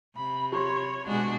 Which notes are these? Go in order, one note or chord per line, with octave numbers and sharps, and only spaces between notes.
C3 B5
G4 C#5 B5 C6
B2 G#3 D4 F#4